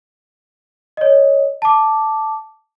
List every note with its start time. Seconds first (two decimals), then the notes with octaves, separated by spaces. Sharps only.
0.97 C#5 D#5
1.62 A5 D6